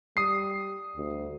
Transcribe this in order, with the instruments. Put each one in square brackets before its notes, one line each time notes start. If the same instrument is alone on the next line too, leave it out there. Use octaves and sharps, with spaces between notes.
[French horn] G3 [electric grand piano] D#6 C7
[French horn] D2